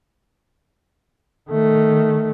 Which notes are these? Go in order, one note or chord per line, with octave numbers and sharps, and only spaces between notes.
D#3 A3